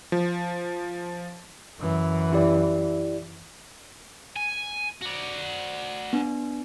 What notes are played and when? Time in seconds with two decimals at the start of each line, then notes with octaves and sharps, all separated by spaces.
0.12 F3
1.79 F#2 E3
2.33 E4 G4 D5
4.36 G#5
5.01 F#4 D5
6.13 B3 D4